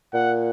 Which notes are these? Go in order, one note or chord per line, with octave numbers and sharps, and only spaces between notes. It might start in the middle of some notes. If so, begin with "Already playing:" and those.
A#2 F#5